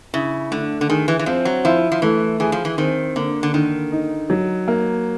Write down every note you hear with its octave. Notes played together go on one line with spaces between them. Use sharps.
C#3 E4
D3 A3
D3
D#3 G#4
E3
E3
F3 C4
F#3
F3 E4
F3
E3 A3
E3 G#4
F3
E3
D#3 C4
D3 A#3
D3
D3 D#3
D#4
F#3
A#3